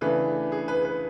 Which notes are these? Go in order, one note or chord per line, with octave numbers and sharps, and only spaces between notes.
C#3 E3 A3 D4 B4
G#4
B4
B4